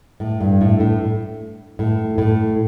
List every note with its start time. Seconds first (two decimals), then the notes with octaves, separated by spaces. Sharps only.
0.20 A2
0.41 G2
0.61 A2
0.80 A2
1.79 A2
2.18 A2